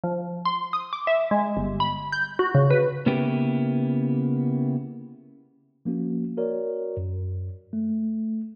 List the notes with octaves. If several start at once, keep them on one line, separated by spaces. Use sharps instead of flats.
F3
C6
D#6
D6
E5
G#3
G1
B5
G6
F#4
C#3
B4
C#3 A#3 B3 E4 G4
F3 A#3 C#4 F#4
F#4 A#4 C#5 D5
F#2
A3